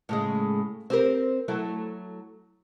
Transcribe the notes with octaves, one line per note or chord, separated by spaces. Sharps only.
A2 C#3 G#3
C4 G4 A#4
F#3 A3 E4